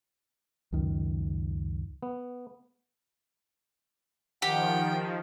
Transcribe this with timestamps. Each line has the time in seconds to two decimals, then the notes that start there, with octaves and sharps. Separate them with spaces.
0.72 C#2 F#2 D#3
2.02 B3
4.42 D#3 F3 G4 F#5 G5